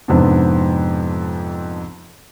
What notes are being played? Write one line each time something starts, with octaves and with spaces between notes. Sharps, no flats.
F2 G#2 C3 B3 C4 D4